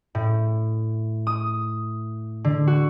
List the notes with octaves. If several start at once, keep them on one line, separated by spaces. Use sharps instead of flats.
A2
D#6
D3
F#4